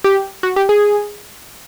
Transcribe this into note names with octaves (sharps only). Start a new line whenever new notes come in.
G4
F#4
G4
G#4